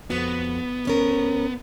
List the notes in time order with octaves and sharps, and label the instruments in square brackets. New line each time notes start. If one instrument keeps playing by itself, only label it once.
[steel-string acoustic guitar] F2 F#4 [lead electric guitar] B3
[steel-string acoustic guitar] D2 C#4 A#4